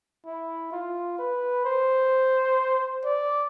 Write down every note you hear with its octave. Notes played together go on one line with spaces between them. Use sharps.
E4
F4
B4
C5
D5